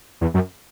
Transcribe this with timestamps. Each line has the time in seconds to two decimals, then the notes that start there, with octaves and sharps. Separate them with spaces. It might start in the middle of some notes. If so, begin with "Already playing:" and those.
0.21 E2
0.34 F#2